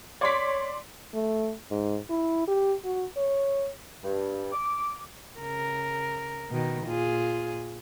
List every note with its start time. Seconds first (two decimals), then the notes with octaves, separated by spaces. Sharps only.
0.21 C#5 D5 C6 D6 B6
1.14 A3
1.71 G#2
2.10 E4
2.48 G4
2.85 F#4
3.17 C#5
4.03 G2
4.52 D6
5.39 C#3 A#4
6.51 B2 D#3
6.85 A#2 F4 G#4